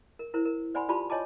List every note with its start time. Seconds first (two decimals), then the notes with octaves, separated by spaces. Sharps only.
0.19 A#4
0.34 E4 A#4 C5
0.46 A#4
0.75 C5 D5 F#5 G#5 B5 C6
0.89 F4 G4 D5 A5 B5 C6
1.10 C#5 D#5 G#5 A5 D6